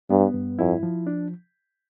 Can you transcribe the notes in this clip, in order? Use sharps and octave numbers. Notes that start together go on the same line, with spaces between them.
G2 B3
G2
F2 E4
F3
D4